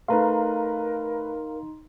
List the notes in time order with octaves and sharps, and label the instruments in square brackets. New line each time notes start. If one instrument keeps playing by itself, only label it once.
[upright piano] A3 B4 [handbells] D#4 C6 [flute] A#4 [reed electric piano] F5 A#5